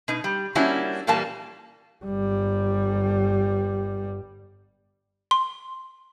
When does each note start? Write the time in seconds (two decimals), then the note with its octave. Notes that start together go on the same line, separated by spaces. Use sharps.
0.08 B2 D#4
0.24 G3
0.55 G3 A#3 C#4 D4 E4 F#4
1.07 A#2 E3 G3 A#3 A5
2.05 G1 G3
5.31 C6